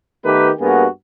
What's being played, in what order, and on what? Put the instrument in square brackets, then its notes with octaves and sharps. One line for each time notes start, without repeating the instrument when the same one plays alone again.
[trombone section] D#3 A3 B3 G4 A#4 B4
G2 A#3 B3 F#4 G#4 A#4